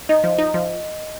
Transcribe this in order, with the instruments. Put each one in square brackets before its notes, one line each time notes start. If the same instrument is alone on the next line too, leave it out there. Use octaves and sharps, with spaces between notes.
[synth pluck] D#4 [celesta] D#5
[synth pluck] F3
D#4
F3